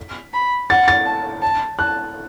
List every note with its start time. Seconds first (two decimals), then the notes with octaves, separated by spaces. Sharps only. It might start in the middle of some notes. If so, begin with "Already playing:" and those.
Already playing: B6
0.33 B5
0.69 F#5 A6
0.88 A6
1.06 A5
1.42 A5
1.78 A5 F#6